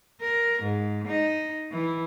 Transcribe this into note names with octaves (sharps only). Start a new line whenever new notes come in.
A#4
G#2
D#4
E3